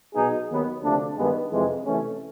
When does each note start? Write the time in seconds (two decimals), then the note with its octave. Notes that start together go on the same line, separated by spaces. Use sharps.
0.15 B2 F#3 B3 D#4 G#4
0.49 D#2 D#3 F#3 B3
0.83 D2 C3 F3 A3 D4
1.17 G2 D#3 G#3 B3
1.52 F2 C3 E3 G#3
1.85 C3 E3 A3 C#4